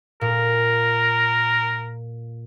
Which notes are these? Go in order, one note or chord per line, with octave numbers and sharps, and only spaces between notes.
A#2 A#4